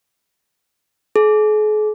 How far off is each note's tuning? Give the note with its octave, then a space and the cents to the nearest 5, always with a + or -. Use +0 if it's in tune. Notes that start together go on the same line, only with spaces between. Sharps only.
G#4 +45